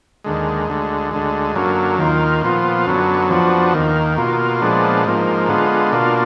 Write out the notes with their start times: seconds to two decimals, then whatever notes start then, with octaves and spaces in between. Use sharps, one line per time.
0.24 D#2 D3 G#3
0.68 D2 D3 G#3
1.11 D2 D3 G#3
1.55 F#2 D3 F#3 A#3
1.99 D#2 D#3 A#3 F4
2.42 A#2 F3 B3 F4
2.86 F#2 D3 F#3 B3
3.30 F2 F3 B3 D4 F#4
3.74 D#2 D#3 A#3
4.17 B2 A#3 F4
4.61 A#2 F3 G#3 B3 D4
5.05 G#2 F3 A#3
5.48 D3 G#3 B3 F4
5.92 B2 A#3 D4 F4